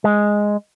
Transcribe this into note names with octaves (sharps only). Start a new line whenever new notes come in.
G#3